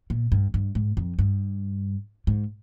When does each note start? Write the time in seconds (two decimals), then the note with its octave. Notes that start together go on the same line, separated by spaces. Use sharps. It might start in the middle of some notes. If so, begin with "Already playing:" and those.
0.10 A#2
0.32 G2
0.54 G2
0.75 G#2
0.97 F2
1.19 G2
2.27 G#2